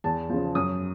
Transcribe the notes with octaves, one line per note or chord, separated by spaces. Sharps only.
E2 A5
C#3 F3
F#2 D#6